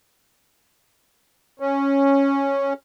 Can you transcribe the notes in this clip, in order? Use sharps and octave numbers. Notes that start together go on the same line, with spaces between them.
C#4